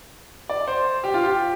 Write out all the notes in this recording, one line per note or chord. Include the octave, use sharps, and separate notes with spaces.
D5
C5
G4
F4
G4